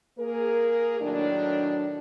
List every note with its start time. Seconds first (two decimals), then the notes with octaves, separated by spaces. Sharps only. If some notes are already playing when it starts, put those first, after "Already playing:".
0.18 A#3 G#4 A#4
1.00 A2 D#3 F#3 D4